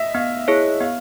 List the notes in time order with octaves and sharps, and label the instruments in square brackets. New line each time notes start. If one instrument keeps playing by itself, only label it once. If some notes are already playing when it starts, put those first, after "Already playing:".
Already playing: [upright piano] D#5 E5
[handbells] B3 [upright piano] F5
[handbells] E4 G#4 C#5
[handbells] B3 [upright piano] F5